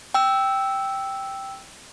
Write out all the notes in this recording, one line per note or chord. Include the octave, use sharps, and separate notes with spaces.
G5 E6